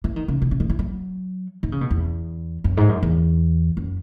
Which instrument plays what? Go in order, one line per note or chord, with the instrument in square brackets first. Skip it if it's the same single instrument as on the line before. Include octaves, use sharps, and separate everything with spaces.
[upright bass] E3
D#3
C#3
B2
C#3
D#3
E3
F#3
D#3
C#3
B2
E2
F#2
G#2
F#2
E2
F#2